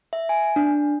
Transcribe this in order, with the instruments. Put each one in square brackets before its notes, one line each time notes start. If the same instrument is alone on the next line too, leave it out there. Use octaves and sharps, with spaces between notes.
[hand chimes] E5
G#5
D4